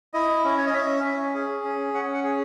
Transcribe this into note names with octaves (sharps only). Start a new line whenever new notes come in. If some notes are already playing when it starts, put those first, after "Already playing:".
E4 D#5
C#4
C#5
D#5
C#4 E5
C#4
G#4
C#4
C#4 F#5
F#5
G#4